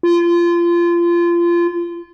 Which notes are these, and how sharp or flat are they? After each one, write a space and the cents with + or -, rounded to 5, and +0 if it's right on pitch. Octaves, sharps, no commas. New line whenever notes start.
F4 -25